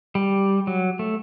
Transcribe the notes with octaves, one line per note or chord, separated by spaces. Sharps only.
G3
F#3
A3